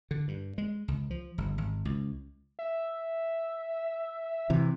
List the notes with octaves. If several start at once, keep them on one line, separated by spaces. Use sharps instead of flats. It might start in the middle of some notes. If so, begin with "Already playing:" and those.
D3
G2
G#3
C#2
F3
G1
G#1
C#2
E5
C3 E3